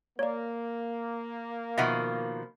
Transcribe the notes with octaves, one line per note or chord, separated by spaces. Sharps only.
A#3 C#5 D5
B2 D#3 F3 D#5 E5 F#5